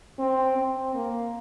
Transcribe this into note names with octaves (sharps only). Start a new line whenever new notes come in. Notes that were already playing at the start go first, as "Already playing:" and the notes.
C4
C4
A#3